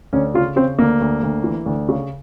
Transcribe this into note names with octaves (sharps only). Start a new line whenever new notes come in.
D2 C#4
C#3 F4
C#3 C4
D2 A#3
D2
D2
E3
D2
C#3